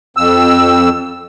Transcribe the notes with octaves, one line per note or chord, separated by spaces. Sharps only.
F2 E6